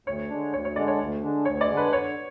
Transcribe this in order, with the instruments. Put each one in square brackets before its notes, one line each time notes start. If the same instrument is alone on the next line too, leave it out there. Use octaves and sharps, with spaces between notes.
[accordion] D2 [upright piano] C#5
[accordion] D3 G#3 D4
[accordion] D2 [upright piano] C#5
[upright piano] C#5
[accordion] D3 G#3 D4 [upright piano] D5
[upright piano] C#5
[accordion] D2
D3 G#3 D4
[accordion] D2 [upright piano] C#5
[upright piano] D5
[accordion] D3 G#3 D4
[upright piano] B4
[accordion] D3 [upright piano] C#5